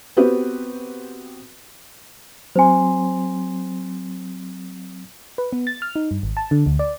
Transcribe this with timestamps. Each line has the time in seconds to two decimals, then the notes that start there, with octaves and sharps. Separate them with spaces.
0.17 B3 C4 F#4 G4 B4
2.56 F#3 C4 C5 G#5 C6
5.38 B4
5.53 B3
5.67 A6
5.82 F6
5.96 D#4
6.11 G2
6.23 G#1
6.37 A5
6.51 D3
6.66 D2
6.79 D5